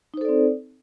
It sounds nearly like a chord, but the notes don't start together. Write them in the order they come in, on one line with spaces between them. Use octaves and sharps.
D#4 C5 A4 D5 C4